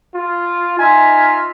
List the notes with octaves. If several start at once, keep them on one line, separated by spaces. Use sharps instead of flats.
F4
D#4 F4 E5 G#5